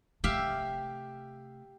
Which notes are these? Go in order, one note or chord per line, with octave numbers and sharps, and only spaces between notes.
C3 A3 G4 E5 F5